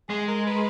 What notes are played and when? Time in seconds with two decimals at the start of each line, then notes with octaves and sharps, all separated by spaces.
0.09 G#3 G#4
0.28 A#4
0.46 B4